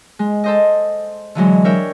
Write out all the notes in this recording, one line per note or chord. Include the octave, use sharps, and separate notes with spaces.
G#3
A4 C5 D#5
D3 E3 F#3 G#3
D4 A#4 C#5 E5 G5